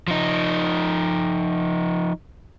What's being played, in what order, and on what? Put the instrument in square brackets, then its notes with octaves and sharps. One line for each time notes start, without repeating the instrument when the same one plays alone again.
[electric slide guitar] F3 D#4